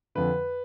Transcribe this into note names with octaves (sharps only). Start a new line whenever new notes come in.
F2 D3 B4